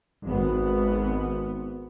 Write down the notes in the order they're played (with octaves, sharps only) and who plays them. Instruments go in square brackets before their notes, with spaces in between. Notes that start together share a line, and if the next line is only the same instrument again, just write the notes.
[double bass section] G#1 B3